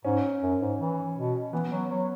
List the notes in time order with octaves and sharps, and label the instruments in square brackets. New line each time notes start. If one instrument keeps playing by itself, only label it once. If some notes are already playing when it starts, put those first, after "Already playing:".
[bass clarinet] G#2 [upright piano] C#4
[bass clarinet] F#2
G#2
E3
B2
[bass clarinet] E3 [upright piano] B3
[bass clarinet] F#3
F#3